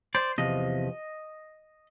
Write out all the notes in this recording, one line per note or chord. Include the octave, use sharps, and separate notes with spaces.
C5 D5
E2 C3 F3 D#5